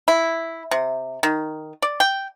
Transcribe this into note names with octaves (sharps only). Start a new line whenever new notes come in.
E4
C3
D#3
D5
G5